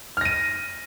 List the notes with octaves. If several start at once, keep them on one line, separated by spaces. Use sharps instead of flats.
F6 A#6 D#7